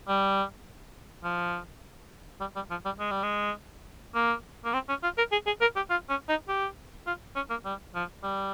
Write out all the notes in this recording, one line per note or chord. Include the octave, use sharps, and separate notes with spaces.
G3
F3
G3
G3
F3
G3
G#3
G3
G#3
A#3
A#3
C4
C#4
F4
A#4
G#4
G#4
A#4
G4
F4
C#4
D#4
G4
F4
C#4
A#3
G3
F3
G3